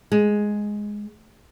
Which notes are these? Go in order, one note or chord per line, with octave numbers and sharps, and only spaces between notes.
G#3